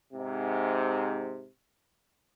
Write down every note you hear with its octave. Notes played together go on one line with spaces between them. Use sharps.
G#2 C3